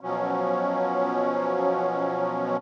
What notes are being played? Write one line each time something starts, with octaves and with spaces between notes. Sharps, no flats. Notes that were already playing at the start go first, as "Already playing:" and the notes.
B2 F3 F#3 C#4